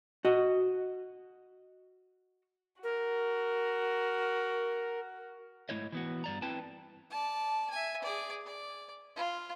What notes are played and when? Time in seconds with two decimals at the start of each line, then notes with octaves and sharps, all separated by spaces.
0.25 F#4 D#5
2.83 F#4 A#4
5.69 G#2 A3 E4 C#5 D#5
5.92 E3 B3 F#4
6.24 G2 D5 A#5
6.42 C4 E4 B4 G5 A5
7.10 D5 A5
7.71 E5 G#5
8.02 G#4 D5
8.46 D5
9.16 F4